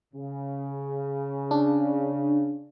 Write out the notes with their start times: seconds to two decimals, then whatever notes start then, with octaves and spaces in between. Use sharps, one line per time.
0.14 C#3
1.51 D4